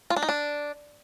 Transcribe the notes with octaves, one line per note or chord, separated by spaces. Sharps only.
F4
D4
D#4
D4